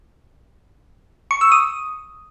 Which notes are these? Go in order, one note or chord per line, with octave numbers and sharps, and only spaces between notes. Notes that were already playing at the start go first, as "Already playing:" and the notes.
C#6
E6
D#6